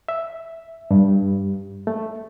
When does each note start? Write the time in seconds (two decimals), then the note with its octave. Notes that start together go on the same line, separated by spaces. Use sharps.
0.08 E5
0.91 G2
1.87 A3